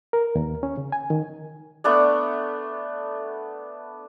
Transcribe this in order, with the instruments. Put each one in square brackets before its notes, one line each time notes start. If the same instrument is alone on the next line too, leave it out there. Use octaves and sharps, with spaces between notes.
[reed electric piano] A#4
D#2
C#4
C#3
G#5
D#3
[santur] A3 B3 D4 D5